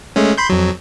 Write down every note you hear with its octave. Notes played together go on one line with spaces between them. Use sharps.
G#3 A3 C#4
B5 C6 G6
F2 F#3